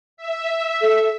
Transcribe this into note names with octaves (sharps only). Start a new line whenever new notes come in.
E5
A4